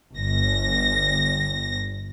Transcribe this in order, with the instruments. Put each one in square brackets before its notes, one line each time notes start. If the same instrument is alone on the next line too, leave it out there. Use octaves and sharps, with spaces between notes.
[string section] G1 A#6